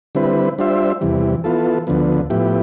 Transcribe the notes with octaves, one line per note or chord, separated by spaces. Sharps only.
D3 G3 C4 E4 B4
G3 D4 F4 C5 E5
E2 C3 E3 G3
E3 B3 F4 A4
D2 D3 F3 B3
A2 F3 B3 E4 G4